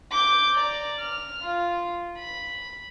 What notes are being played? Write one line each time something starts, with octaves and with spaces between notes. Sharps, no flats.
D6 G6
D5 A#5
F6
F4
B5